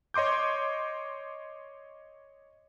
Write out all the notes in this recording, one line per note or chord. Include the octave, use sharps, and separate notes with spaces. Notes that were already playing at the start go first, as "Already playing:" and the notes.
C#5 D#5 C6 D6 G6